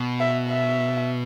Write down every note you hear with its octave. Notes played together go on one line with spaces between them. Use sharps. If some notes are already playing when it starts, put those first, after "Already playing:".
Already playing: B2
E5
E5